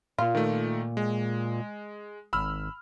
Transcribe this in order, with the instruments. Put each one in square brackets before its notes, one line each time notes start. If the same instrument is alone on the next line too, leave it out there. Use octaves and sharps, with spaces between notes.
[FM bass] A#2 [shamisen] F4
[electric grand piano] D#3 A3
G#3
[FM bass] G#1 [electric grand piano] B5 E6 F6